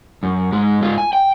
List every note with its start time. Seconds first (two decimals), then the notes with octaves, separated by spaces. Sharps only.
0.23 F#2
0.52 G#2 G#3
0.82 G#2 F4
0.98 G#5
1.13 G5